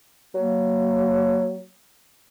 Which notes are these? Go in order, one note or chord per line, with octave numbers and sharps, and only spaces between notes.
F#3 A#3